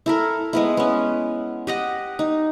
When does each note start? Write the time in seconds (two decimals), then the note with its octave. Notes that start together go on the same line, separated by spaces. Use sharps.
0.06 E4 A4 A#4
0.53 G#3 B3 E4
0.77 B3 C#4
1.67 G4 D#5 F#5
2.19 D#4